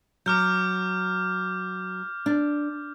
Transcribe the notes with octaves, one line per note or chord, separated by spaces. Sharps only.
F#3 D6 F6 G6
D4